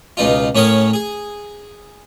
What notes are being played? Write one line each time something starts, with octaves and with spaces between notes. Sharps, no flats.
C#2 B2 D#4 F4
A2 C#4 A#4 C#5 D#6
G#4